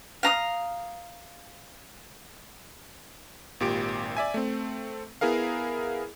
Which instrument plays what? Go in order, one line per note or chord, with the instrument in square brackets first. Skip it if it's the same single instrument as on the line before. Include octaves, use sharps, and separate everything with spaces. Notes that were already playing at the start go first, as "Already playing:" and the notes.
[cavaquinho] F5 A#5 D#6
[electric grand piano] G#1 A#2 G4 D7
D5 E5 G#5
A3 C4
B3 E4 G#4 A#4 F5